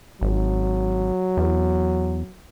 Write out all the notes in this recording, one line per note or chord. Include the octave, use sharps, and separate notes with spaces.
G#1 F#3
E2